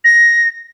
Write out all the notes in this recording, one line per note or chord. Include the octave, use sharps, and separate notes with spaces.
A#6